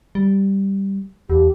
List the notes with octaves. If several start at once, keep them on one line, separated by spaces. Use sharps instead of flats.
G3
E2 G4